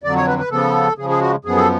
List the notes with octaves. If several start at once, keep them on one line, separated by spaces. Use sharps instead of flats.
F2 D3 F#3 D5
C#5
B4
B4
C#3 F3 B3 A4
C#3 F3 G#3 G#4
G#4
F#4
F#2 F3 B3 G#4
A4